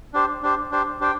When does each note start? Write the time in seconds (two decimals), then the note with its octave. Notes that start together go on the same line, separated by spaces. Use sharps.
0.14 D4 G4 C5
0.43 D4 G4 C5
0.72 D4 G4 C5
1.01 D4 G4 C5 G5